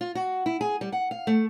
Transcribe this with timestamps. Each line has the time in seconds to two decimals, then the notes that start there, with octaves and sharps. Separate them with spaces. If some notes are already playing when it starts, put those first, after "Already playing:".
0.01 F4
0.15 F#4
0.46 E4
0.61 G#4
0.81 G3
0.92 F#5
1.11 F5
1.27 A3